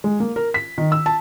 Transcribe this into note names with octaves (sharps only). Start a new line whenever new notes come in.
G#3
A#3
A#4
B6
D#3
E6
A5